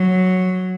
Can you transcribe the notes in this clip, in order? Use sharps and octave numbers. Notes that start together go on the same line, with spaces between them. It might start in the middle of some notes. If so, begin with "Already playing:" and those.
Already playing: F#3